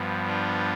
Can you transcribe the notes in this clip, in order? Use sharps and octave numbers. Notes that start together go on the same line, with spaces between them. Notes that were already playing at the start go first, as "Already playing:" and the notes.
Already playing: G2 F3 B3
D4 F4